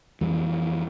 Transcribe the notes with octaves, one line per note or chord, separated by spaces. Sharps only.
F2 E3 G3